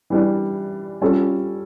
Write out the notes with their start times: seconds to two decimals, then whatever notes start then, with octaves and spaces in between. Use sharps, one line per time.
0.10 E3 G3 D4
1.01 G3 C#4 F4 A4